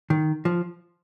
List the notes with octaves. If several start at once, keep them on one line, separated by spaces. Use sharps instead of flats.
D#3
F3